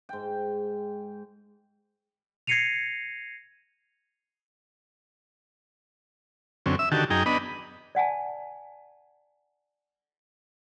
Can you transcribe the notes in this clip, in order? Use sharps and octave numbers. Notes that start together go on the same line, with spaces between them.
G#2 G5
G#6 A#6 C7 C#7 D#7 F7
F#2 D3 C4 C#4
E5 E6
D3 D#3 F#4 G4 A5
F#2 D#4 G#4 G5 A#5
B3 D4 D#5 B5
D5 F#5 G#5 A5